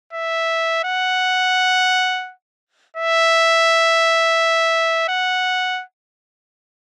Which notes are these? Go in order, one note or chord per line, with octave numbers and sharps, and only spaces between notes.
E5
F#5
E5
F#5